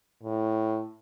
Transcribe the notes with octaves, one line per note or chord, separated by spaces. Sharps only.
A2